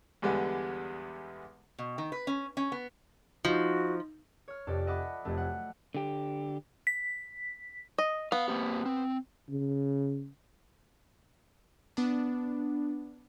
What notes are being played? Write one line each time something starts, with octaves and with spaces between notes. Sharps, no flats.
E2 D3 G3 G#3 B3
B2
D#3
B4
C#4
C#4
B3
F3 D#4 F#4
C#5 F6
F1 F2 G4 A4 D5
D#5 E5 F#5 B5 D6
F1 F2 F#3 A3
F#5
D3 G4
B6
D#5
B3 F5
A#3 C4 G4
C4
C#3
B3 D4